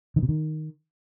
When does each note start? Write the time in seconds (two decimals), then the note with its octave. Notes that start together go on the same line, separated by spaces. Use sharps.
0.16 D#3
0.22 B2
0.29 D#3